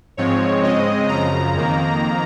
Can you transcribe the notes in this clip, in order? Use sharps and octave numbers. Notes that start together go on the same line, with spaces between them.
G#2 F3 G#3 C4 C#5
C#3 G#3 C4 D#5
F#2 C#3 F3 A#5
F2 D#3 A#3